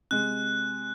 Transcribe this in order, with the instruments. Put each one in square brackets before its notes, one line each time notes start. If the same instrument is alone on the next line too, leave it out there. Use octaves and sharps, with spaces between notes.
[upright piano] C3 G#3 [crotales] F#6